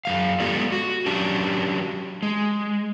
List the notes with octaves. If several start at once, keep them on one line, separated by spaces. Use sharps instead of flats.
F#2 G#3 F5
G#3 B3 F4 G4 A4 D5
F#4
F#3 C#4 D4 G4
G#3